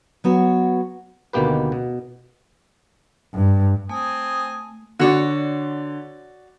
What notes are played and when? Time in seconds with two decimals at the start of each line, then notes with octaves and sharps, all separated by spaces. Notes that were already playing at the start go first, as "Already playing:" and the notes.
0.24 F#3 B3 F#4 C#5
1.33 D2 B2 D#3 A#3 G4 B4
1.72 B2
3.34 G2
3.89 A3 C4 G#5 D#6
4.99 D3 F#4 C#5 D5